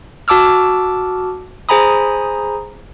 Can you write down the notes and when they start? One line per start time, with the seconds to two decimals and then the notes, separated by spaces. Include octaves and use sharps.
0.28 F#4 A5 D6 E6 F6
1.69 G#4 C5 G#5 A#5 B5 D#6